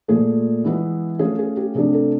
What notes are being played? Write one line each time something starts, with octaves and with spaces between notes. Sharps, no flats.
A#2 F3 A3 G#4
E3 G#3 B3 E4
F3 A3 C#4 F4 G#4
G#4
G4
C3 F3 A3 D4 G#4
A4